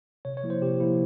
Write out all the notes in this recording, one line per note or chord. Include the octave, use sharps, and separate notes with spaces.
C3 C#5
C#5
F3 A#3 E4
C5
C3 G4
F3 A#3 E4